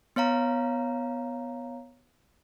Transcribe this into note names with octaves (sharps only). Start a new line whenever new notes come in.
B3 C#5 F5 A#5